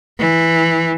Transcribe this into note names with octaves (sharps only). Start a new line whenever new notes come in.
E3